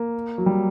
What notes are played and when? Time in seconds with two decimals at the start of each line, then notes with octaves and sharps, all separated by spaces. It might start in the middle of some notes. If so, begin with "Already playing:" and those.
Already playing: A#3
0.38 F#3
0.46 G3